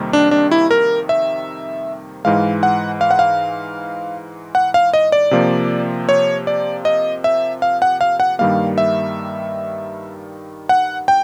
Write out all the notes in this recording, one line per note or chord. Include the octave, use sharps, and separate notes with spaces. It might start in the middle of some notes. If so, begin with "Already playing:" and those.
Already playing: F2 C3 D#3 G3 A#3
D4
D4
E4
A#4
E5
G#2 E3 G#3 F5
F#5
F5
F#5
F5
F#5
F5
D#5
D5
C3 F3 A#3
C#5
D5
D#5
E5
F5
F#5
F5
F#5
G2 D#3 G3 A#3 F5
E5
F#5
G5